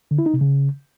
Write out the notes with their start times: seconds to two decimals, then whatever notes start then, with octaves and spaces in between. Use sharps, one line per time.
0.11 D3
0.19 E4
0.26 D#4
0.34 C3
0.41 C#3